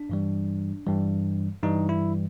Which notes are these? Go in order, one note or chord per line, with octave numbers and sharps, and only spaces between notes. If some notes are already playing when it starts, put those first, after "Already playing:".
Already playing: D4
G2 E3 G3
G2 E3 G3
G2 E3 G3 D#4
E4